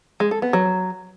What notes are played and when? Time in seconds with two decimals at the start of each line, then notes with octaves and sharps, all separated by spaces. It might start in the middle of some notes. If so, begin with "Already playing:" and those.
0.20 G#3
0.31 A4
0.42 B3
0.53 F#3